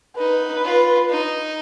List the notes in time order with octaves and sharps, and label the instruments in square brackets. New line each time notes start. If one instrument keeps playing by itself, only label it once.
[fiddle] D#4 [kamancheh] B4
[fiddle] F4
D#4